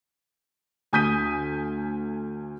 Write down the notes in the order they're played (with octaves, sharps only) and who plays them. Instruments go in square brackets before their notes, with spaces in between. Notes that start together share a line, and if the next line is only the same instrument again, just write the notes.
[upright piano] D2 G#5 D#6 G6 B6 D#7